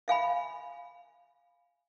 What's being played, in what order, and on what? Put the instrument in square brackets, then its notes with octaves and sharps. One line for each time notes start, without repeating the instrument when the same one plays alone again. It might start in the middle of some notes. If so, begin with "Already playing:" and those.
[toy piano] E5 F5 G#5 B5